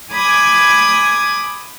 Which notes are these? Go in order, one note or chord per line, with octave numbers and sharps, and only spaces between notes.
G#5 B5 D6 D#6 G#6